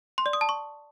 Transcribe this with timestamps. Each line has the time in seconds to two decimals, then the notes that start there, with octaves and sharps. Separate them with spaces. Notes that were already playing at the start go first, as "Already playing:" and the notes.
0.18 C6
0.26 D5
0.33 D#6
0.41 A5
0.49 C#6